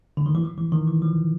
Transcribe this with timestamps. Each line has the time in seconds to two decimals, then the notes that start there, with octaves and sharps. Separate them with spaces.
0.17 D3
0.26 D#3
0.35 E3
0.43 F3
0.58 E3
0.72 D#3
0.87 E3
1.02 F3